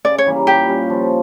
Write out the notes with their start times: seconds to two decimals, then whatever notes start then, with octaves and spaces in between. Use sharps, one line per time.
0.04 C#3 D5
0.18 C#5
0.26 E3 G3 A#3
0.46 A#2 G4
0.68 G3 C#4
0.90 F3